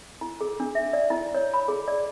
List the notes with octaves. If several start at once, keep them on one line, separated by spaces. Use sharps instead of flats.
E4
G#4
D4
E5
D5
E4
C#5
B5
G#4
D5